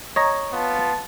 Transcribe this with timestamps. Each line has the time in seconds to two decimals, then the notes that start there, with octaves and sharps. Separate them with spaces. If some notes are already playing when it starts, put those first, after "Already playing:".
0.16 C#5 D#5 A#5
0.53 B3 F4 A5